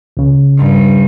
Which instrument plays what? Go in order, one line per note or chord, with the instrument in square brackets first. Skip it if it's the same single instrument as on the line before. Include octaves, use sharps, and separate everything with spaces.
[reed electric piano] C#2 C#3
[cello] G2